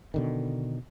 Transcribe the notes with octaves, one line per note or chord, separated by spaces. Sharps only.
B2 D3 D#3